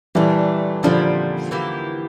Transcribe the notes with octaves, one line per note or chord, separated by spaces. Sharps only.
A#2 E3 G3 A3 D4
A#2 D3 F3 G3 C4 E4
E3 A#3 E4 G4